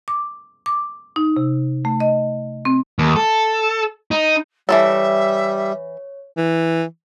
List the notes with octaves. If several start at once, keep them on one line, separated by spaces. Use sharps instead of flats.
D6
D6
D#4
C3
A3
D#5
C4
D#2
A4
D#4
E3 F3 G3 A4 C#5 E5
E3